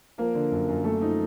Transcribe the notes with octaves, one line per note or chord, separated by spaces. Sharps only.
F3 A#3 A#4
D3
F#2
F#2
A3 A#3 A4
F3 D#4